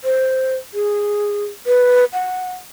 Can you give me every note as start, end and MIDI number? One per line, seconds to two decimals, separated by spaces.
0.04 0.55 72
0.74 1.44 68
1.66 2.05 71
2.13 2.52 78